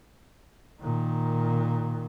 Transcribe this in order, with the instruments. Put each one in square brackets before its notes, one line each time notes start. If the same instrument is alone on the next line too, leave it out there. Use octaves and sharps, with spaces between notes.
[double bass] A#2 D#3